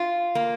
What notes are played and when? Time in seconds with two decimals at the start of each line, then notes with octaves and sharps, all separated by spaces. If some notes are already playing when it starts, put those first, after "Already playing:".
Already playing: F4
0.35 A#3